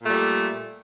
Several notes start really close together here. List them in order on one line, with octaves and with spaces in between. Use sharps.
A#2 A3 G3